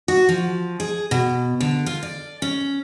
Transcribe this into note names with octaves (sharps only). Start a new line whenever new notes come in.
F#4
F3
G#4
B2
D3
F4
D5
C#4